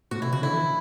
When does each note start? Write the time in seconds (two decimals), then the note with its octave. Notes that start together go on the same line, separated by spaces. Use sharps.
0.11 A2 F#4
0.22 B2 E4
0.32 C#3 F#4
0.42 D3 E4
0.53 E3